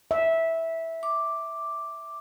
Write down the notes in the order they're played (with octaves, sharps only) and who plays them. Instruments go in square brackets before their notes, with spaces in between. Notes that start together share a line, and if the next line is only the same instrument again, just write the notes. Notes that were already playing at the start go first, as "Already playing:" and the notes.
[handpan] E5
[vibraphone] D6